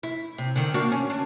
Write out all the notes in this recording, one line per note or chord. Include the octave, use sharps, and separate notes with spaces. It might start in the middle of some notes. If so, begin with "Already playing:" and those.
E4
C3
D3 D#3
A#3 D4 F#4
C#4
D4